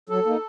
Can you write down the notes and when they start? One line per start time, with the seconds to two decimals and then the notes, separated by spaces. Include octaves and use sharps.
0.09 F#3 A4
0.26 A#3 D#4